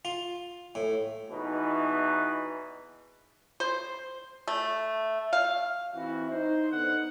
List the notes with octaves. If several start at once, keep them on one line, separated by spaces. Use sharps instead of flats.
F4
A2
E2 B2 E3 D#4 B4
C5
A3
F5
E3 C4 E4 F#4
D#4 C5
D3 B3 D#4 F#5